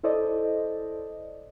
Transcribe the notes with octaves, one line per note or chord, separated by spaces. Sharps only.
E4 A4 C5 D5 D#5